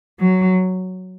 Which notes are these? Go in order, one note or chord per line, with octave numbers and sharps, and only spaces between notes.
F#3